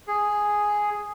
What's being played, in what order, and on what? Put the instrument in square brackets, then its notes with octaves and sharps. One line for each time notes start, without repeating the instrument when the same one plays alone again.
[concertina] G#4